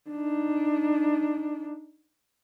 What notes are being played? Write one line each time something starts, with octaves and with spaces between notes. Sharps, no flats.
D4 D#4